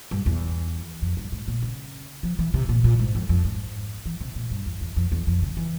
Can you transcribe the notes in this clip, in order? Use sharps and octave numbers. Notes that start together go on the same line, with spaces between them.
G2
E2
F2
G2
G#2
A#2
C#3
F3
E3
C3
A#2
A#2
G#2
F2
F2
G#2
E3
C3
A#2
G2
E2
E2
F2
E2
F2
C#3
E3